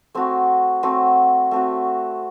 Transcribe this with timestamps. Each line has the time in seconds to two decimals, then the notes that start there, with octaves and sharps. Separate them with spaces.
0.14 A3 C4 F#4
0.83 A3 C4 F#4
1.51 A3 C4 F#4